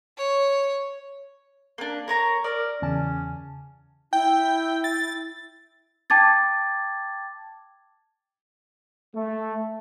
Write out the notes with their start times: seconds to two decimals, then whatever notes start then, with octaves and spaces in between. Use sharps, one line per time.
0.17 C#5
1.78 A#3 D4
2.08 A#4 C#5 A#5
2.44 A#4 D5
2.82 E2 C#3 C#4 A5
4.13 E4 G5
4.84 A6
6.10 G5 A5 D6 G#6 A6
9.15 A3